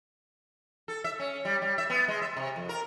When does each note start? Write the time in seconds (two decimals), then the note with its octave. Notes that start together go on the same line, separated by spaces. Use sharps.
0.88 A4
1.04 E5
1.20 C#4
1.45 G3
1.62 G3
1.78 E5
1.90 B3
2.08 G#3
2.22 E5
2.37 C3
2.56 F2
2.69 A#4